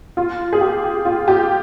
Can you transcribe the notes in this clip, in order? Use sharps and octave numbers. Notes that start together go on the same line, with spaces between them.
F4
G#4
G4
F4
G4